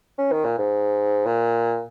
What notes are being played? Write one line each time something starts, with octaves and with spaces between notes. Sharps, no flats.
C#4
D#3
A#2
G#2
A#2